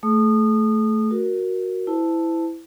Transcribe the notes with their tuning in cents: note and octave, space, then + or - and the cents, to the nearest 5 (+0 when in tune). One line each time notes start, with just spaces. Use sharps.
A3 +0 G#4 +45 D#6 -25
F#4 +0 A#4 +0
E4 +0 C5 -40 A5 +0